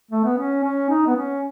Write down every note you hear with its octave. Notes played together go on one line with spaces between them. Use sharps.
A3
B3
C#4
C#4
D#4
B3
C#4